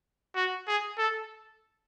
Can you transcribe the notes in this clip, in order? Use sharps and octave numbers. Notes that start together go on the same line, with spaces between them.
F#4
G#4
A4